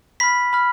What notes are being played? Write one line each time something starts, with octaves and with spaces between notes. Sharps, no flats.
B5 F6 B6
B5 F6